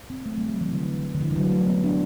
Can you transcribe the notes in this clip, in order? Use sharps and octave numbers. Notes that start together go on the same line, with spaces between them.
C4
A3
G3
F#3
E3
D3
D3
E3
G3
F#3
A3
B3
D4